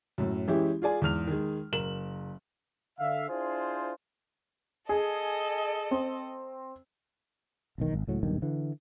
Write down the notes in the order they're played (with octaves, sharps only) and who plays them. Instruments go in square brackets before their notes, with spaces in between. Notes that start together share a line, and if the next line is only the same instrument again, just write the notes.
[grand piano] F#2 A2
E3 G#3 C#4 E4 G4
F4 G#4 D5 G#5
E2 G#2 F6 F7
D#3 G#3
F#1 A#4 E7 F#7
[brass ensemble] D3 E5 F5
D4 E4 F4 G#4 C5
[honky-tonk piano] G#4 [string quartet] A4 D#5
[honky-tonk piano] C4
[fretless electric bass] E1 B1 D#3
G#1
C#2 A2 F#3
D#1 B1 G2 D#3
D3 E3